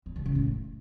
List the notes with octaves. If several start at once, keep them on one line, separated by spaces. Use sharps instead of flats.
E2
C3
C#3
A2